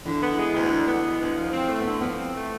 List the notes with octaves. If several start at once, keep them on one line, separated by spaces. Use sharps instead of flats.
D3 E3
B3
G#3
D2
D3
B3
G#3
D2
F3
C4
A3
B3
D3
F3 B3
C4
A3